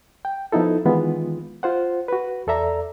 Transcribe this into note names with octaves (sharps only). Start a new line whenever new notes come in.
G5
F3 B3 D#4 E4 A4
D#3 E3 G#3 B3 F4
F4 C5 F#5
F#4 B4
E2 A4 D5 E5 A#5